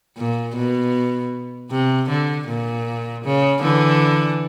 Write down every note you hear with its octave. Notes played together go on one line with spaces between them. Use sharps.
A#2
B2
C3
D3
A#2
C#3
D3 E3